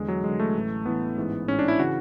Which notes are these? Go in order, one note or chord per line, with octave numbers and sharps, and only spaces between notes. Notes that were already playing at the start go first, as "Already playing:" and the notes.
Already playing: E2 D3 G#3
F#3
E2 D3 G#3
A3
A1 A2 E3
A1 A2 E3 B3
A1 G#2 E3
A1 G#2 E3 C#4
D4
E4
C#3 E3 F#4